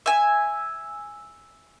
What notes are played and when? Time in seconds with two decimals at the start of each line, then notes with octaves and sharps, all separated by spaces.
0.06 E5 G#5